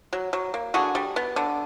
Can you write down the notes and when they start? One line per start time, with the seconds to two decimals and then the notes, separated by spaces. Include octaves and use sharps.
0.13 F#3
0.33 F#3
0.54 A#3
0.74 D3 F#4 G#4
0.95 G3
1.16 B3
1.36 D3